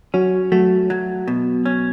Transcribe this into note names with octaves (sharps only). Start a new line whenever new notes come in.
F#3 C#4 F#4
F#3 A3 F#4
F#3
B2
C#4